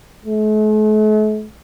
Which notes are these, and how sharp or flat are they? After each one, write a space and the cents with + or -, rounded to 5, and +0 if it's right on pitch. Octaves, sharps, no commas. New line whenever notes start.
A3 -45